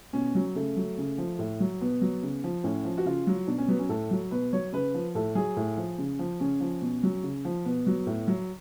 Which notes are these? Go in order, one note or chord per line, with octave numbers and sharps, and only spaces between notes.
B2 C#4
F#3
C#3 A3
F#3
C#3
F3
A2
F#3
B2 B3
F#3
C#3
F3
A2 C#4
F3
F#4
C#3 F4
F#3
B2 D4
C#4
F#3 B3
C#4
A2 A4
F#3
B2 B4
F#3 C#5
C#3 B4
F3
A2 A4
F#3 G#4
A2
F3
C#3
F3
C#3 C#4
F3
B2
F#3
C#3
F3
B2 B3
F#3
A2
F#3